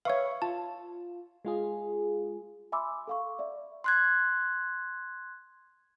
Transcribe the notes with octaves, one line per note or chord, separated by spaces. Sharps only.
B4 C#5 E5 F5 C#6
F4 A5
G#3 F4 G#4
E5 G#5 B5 C6 D6 E6
A4 F5 C#6
D5 E5
C6 F#6 G#6